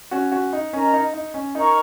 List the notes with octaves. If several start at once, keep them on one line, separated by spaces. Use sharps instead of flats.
C#4 F#4
C#4 F#4
D#4
C#4 A#4 D#5 A#5
D#4
D#4
C#4
D#4 A#4 C#5 A#5 C#6